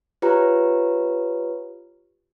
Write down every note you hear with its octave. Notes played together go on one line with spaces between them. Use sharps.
F4 G4 B4 C#5 A#5